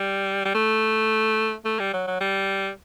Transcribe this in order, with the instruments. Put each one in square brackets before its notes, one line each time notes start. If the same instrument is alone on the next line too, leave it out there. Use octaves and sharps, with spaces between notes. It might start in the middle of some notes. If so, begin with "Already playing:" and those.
Already playing: [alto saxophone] G3
G3
A3
A3
G3
F#3
F#3
G3